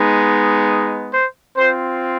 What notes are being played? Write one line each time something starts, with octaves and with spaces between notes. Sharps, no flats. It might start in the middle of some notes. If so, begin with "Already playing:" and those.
Already playing: G#3 B3 D#4
C5
C4 F4 C5